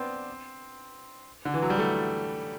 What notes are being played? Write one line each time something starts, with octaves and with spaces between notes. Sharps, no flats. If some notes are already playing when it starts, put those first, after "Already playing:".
Already playing: B3 C4 D4
D3
E3
F#3
G3
A3